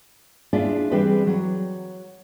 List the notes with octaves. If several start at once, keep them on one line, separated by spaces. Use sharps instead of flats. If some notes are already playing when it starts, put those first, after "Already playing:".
D4 E4 F4 G#4 D5 E5
E3 G3 C4 G#4 B4
F#3